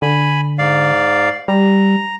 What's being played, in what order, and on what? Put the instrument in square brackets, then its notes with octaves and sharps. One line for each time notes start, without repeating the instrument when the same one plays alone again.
[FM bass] D3 [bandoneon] G#5 B5
[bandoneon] G#2 D5 F5
[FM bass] G3 [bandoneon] A#5